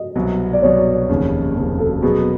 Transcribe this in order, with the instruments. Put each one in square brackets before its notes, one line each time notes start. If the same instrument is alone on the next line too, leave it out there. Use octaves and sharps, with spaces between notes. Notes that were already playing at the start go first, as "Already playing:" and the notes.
Already playing: [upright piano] D#5
[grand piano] C2 B2 F#3
[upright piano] D5
[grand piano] C2 B2 F#3 [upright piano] C#5
[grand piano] F1 D#2 C#3
F1 D#2 C#3
[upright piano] A4
[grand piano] B2 F#3 B3 [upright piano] G#4